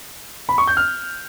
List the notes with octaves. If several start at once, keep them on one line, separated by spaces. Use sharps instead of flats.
B5
C#6
G6
F6